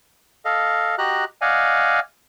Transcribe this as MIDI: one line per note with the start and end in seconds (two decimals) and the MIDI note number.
0.45 0.95 69
0.45 0.95 75
0.45 0.95 77
0.98 1.25 66
0.98 1.25 67
0.98 1.25 75
0.98 1.25 82
0.98 1.25 90
1.41 2.00 74
1.41 2.00 75
1.41 2.00 77
1.41 2.00 78
1.41 2.00 80